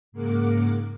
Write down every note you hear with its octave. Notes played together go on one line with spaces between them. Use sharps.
G#2 C#3 A#3 A#4 F#5 D6